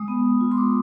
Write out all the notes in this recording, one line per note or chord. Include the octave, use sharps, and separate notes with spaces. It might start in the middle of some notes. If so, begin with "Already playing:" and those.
Already playing: G#3 D#6
B3
G#3
F4
C6
G#3 D6